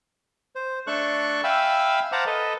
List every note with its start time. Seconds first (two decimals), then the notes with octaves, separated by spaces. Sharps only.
0.55 C5
0.87 A3 D4 A4 C#6 F#6
1.44 E5 F5 G5 G#5 B5 E6
2.12 C5 F5 F#5 A5 A#5 D6
2.26 A4 B4 D#5